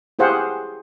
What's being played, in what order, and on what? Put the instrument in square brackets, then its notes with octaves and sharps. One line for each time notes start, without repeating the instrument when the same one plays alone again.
[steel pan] E4 G4 G#4 C5 F5 F#5